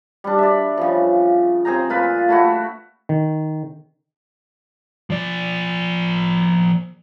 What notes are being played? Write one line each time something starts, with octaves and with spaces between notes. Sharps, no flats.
G3 D4
D5 E5
C#3 F3
C4 G#4 G5 A#5
A#2 F4 B4 B5
A3 E4 F#4
D#3
F3 D5